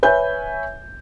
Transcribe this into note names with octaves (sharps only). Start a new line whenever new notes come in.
B4 C#5 E5 G#5 G6